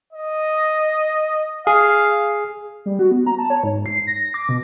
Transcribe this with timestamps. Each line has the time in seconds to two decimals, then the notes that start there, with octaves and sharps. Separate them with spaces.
0.13 D#5
1.67 G#4 F5
2.86 G3
2.99 F#4
3.11 B3
3.27 A#5
3.38 A5
3.50 C#5
3.64 G#2
3.86 C7
4.07 A#6
4.21 A#6
4.34 D6
4.49 B2